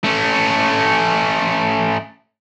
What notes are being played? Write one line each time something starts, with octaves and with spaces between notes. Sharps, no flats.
A3 C#4